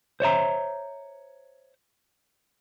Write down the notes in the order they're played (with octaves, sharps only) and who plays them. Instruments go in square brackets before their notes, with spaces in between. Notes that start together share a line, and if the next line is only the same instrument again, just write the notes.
[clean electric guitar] C5 C#5 E5 A#5